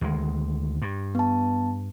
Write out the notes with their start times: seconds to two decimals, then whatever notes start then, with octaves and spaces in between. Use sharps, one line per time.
0.01 D2 D#3 G#3
0.82 G2
1.15 B3 A5